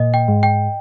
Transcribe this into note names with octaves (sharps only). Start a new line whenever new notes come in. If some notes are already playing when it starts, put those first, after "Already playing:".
Already playing: A#2 D#5
G5
G#2
G5